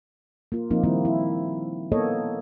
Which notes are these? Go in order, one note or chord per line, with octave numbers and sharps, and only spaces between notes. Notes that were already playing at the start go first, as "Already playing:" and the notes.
A#3 F4
F3 A#3 C4 D#4
D#3 G3 A#3 C4 E4
E4
A#3 B3 A4 C#5 D#5